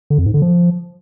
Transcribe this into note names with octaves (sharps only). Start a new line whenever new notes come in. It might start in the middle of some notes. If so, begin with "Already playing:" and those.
D3
F2
G#2
D3
F3